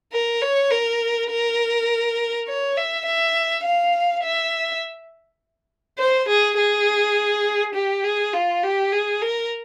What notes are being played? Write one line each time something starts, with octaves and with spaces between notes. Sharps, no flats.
A#4
C#5
A#4
A#4
C#5
E5
E5
F5
E5
C5
G#4
G#4
G4
G#4
F4
G4
G#4
A#4